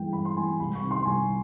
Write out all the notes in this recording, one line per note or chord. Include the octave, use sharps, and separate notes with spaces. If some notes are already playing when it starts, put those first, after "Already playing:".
Already playing: G2 E3 G#3 G5
G2 B5
C6
E3 G#3 G#5
C2 B5
C#6
C3 D#3
C6
C2 G#5